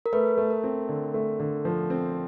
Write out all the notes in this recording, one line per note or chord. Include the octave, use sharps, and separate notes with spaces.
A#4
A3 B4
A3
A#4
C4
D3
A3
D3
F3
C4